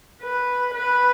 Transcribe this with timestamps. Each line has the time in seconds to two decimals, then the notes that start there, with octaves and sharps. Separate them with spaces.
0.22 B4
0.74 B4